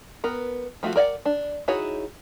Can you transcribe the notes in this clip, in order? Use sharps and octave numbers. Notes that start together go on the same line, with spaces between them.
B3 A#4
F3 A3 F4 F#4
A#4 D5 E5 F#5
D4
D#4 E4 F#4 G#4 C#5